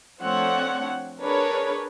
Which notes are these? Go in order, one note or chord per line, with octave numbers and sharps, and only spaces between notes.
F3 A3 C4 D4 C#5 F#5
D4 G#4 A#4 B4 C#5